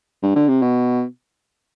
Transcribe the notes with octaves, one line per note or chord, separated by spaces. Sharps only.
G2
D3
C3
B2